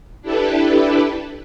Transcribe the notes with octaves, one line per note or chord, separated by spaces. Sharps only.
D4 E4 G4 A4 B4